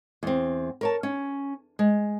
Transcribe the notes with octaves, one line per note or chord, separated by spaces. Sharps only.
E2 C4
A#4 C#5 A5
C#4
G#3